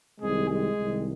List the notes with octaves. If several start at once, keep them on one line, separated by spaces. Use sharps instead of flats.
C2 C3 D#3 G#3 G#4
G#3 G#4
C2 C3 D#3